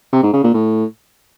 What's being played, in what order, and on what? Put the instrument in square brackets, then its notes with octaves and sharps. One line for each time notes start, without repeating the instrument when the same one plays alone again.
[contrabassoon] C3
G#2
C#3
A#2
A2